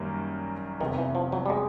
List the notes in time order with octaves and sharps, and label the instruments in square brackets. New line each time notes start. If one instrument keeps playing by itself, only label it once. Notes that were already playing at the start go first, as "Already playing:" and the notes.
Already playing: [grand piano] F#2 D#3 G3 A#3
[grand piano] F1 E2 C3 [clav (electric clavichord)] D#3
[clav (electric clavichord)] E3
F3
F#3
G3
G#3